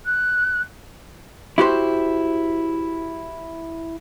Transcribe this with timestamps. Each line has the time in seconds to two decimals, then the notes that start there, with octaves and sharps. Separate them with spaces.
0.05 F#6
1.58 E4 F#4 G4 C5